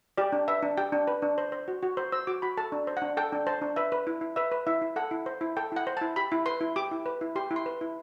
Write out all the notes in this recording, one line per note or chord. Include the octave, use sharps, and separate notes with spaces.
G4 D5
D4
B4 E5
D4
G4 G5
D4
B4
D4
C5
C5
F#4
F#4
C5
C5 E6
F#4 D6
F#4 B5
A4 A5
D4
C5
F#5
D4
A4 G5
D4
C5 A5
D4
B4 E5
B4
E4
E4
B4 E5
B4
E4 E5
E4
A4 F#5
E4
C5
E4
A4 G5
E4 F#5
C5
E4 A5
G4 B5
E4
B4 C6
E4
G4 D6
E4
B4
E4
G4 C6
E4
C6
B4
E4